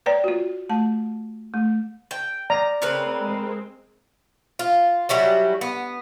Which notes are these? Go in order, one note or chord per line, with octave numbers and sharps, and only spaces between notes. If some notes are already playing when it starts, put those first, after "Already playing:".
B4 C#5 D5 G5 A#5
F4 F#4
A3 A5
A3
G5
D5 A#5
C#3 C4 A#4 B4
G#3 C4
F4
F#3 G3 C#4 E4
B3